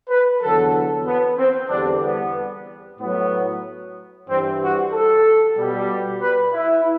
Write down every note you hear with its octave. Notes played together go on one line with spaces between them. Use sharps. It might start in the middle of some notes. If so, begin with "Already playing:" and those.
B4
E2 D3 F#3 A4
B3
C4
E2 D3 G3 D4
B3
A2 F#3 B3
G2 E3 G3 C4
F#4
A4
B2 G3
B4
E4